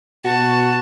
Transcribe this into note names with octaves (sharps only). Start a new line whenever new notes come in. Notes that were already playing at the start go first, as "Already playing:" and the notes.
B2 F#4 A5